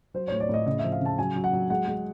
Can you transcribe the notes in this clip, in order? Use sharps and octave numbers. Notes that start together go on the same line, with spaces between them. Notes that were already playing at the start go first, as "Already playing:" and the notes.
F#3 C5
A2 C#5
D5
A2 D#5
C#3 D#5
E5
F3
F5
C#3 A5
F#3 G#5
F#3
F#5
F#3
G#3 F#5
G#3